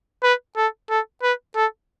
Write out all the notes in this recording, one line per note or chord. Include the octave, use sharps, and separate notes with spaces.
B4
A4
A4
B4
A4